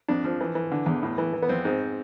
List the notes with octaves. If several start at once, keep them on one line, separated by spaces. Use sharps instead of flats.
F2 D4
F3
E3
E3
D3
E2
A2
E3
E3
B3
F2 C4
G#2 C4